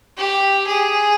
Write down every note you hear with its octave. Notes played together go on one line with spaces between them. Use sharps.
G4
G#4